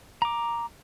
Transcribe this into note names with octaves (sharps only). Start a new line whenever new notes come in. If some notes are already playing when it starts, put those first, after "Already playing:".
A#5 D6